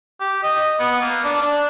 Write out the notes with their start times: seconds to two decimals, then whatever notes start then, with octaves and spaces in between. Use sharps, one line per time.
0.20 G4
0.43 D#5
0.80 B3
1.02 A#3
1.24 D4
1.42 D4